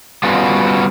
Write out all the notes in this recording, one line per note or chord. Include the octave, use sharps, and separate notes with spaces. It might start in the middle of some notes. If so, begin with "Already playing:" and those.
G3 B3 C#4 F4 F#4